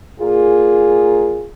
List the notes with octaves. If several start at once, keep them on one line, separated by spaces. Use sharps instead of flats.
A#2 A#3 F4 G#4